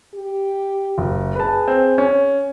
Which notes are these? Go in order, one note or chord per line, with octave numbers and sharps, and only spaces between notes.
G4
F#1
G#4 B4 A5
C4
C#4